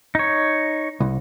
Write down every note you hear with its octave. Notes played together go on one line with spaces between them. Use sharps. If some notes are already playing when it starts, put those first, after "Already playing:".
D#4 C#5
C2